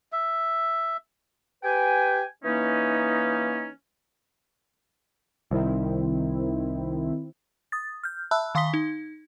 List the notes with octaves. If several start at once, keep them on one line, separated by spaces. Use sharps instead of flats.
E5
G4 B4 G5 G#5
E3 A#3 C#4 D#4
C2 D#3 C4 E4
D#6 A6
F6 G6
E5 A5 B5 E6 F#6
D#3 F5 C6 D#6 B6 G7
D#4